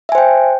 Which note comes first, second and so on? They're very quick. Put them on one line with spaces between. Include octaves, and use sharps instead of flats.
E5 G#5 C5 G5